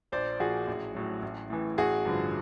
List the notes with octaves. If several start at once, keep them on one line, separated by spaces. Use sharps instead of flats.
A#1 C5 D5
A#2 F3 F#4 G#4
A1
A2 F#3
A1
A2 E3
A1 F#4 G#4
G2 D3 F3